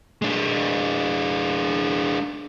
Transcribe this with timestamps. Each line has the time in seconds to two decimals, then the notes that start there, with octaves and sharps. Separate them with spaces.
0.22 G#3 D4